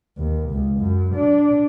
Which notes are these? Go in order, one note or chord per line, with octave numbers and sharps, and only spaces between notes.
D#2
C#2
F#2
D4